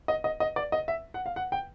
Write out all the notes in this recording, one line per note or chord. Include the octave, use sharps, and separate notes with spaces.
D#5
D#5
D#5
D5
D#5
E5
F#5
F5
F#5
G5